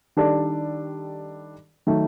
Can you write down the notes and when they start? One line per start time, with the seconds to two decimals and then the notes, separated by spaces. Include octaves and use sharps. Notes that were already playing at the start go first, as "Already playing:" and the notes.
0.17 D#3 G3 D4 A4 D5
1.87 D#3 F#3 A3